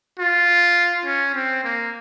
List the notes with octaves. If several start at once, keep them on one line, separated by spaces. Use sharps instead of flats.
F4
C#4
C4
A#3